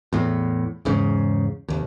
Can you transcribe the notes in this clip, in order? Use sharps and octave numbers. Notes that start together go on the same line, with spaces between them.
E2 A2
E2 G#2 C#3
F1 D#2